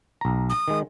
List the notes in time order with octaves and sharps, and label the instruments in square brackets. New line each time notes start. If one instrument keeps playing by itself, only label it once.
[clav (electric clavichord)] B1 A#5
[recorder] D#6
[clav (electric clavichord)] D#3 G#3